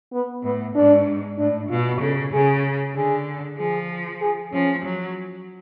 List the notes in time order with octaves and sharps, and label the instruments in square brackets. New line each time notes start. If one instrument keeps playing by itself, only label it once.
[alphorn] B3
[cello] A2 [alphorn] B3
[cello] G#2 [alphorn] D4
[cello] A2 [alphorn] D4
[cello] B2 [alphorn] F4
[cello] C#3 [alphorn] A4
[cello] C#3 [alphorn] G#4
[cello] D3 [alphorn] G#4
[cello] F3 [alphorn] G#4
[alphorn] G#4
[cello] F3 [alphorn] C#4
[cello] F#3